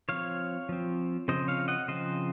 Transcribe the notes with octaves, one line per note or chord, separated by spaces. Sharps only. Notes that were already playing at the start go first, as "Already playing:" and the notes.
F3 C4 C#5 F5
F3 C4
C#3 F3 C4 C5 D#5
C#5 F5
D#5 F#5
C#3 F3 C4 C5 D#5